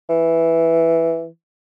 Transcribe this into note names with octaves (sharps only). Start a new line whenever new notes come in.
E3